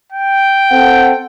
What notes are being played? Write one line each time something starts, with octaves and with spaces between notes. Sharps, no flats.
G5
C4 A4 F#5